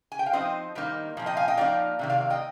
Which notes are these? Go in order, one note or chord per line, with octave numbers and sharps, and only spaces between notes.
G#5
G5
F5
F3 C4 D#4 C5 D#5
D#3 G3 A#3 D#4
A#2 F3 C4
D#5 G5
F5 G#5
D#5 G5
F3 A#3 D#4 D5 F5
C3 D#3 A#3
D5 F5
D#5 G5